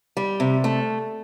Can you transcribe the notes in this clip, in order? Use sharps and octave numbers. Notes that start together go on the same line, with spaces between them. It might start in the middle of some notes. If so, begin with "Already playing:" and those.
G3
C3
A3